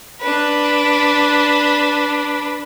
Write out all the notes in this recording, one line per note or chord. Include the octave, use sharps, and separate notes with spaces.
D4 B4